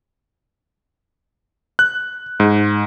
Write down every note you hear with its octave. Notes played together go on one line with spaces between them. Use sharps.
F#6
G#2